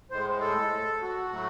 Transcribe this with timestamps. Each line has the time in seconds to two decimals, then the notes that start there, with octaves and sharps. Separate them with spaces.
0.10 A2 G#3 C5
0.41 A4
1.02 F#4
1.33 A2 F#3 A3